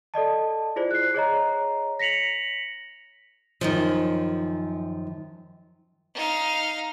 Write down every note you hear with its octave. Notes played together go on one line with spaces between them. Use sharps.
A4 D5 D#5 A5
E4 F4 G#4 C5 D5
F#6 C7
G#4 C#5 D#5 A#5
A#6 B6 C#7 F7 F#7
F#2 D#3 F3
D#4 F5